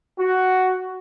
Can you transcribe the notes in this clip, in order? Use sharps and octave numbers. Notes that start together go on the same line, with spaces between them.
F#4